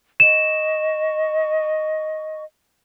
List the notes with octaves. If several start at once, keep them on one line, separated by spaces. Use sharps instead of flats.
D#5 C#6 E7